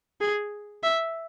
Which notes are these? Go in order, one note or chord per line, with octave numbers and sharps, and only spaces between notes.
G#4
E5